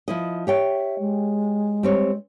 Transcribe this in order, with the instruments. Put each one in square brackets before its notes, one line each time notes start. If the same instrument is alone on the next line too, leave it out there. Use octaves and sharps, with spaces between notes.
[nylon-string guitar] F3 E4 D#5
[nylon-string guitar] G4 C#5 G5 [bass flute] E5
[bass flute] G#3
[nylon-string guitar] G3 C4 C#5